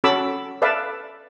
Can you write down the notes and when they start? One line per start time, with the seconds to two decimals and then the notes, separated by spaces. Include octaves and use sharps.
0.04 C#4 F#4 A4 B5 D6 E6
0.62 A4 B4 D5 E5 F5 A5